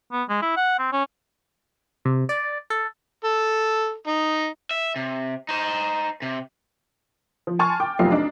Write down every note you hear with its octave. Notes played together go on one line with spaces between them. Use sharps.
B3
G#3
E4
F#5
C4
C#4
C3
D5
A4
A4
D#4
E5
C3
D#4 C5
C3
F3
G#5 A5 C6 C#6 F6 A6
G5 D6
F1 B1 F4 G4 C7
D4 D#4